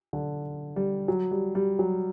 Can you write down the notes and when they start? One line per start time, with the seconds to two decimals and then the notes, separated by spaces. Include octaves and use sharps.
0.13 D3
0.76 G3
1.08 F#3
1.31 G3
1.55 G3
1.79 F#3